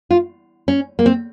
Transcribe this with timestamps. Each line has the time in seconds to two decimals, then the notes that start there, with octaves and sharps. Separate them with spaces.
0.10 F4
0.68 C#4
0.99 A#3
1.06 C4